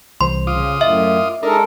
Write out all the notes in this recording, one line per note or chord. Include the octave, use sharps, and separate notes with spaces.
C2 E3 C5 C6
C#3 F4 D6 D#6
F#2 A2 D#5 E5
G#3 D4 D#4 A4 A#4 A#5